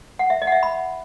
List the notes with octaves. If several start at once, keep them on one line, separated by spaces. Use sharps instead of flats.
F#5
E5
D#5
F#5
E5
B5